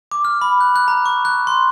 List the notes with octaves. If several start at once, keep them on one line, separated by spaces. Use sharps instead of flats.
D6
F6
B5
F#6
F#6
A#5
C#6
F#6
C6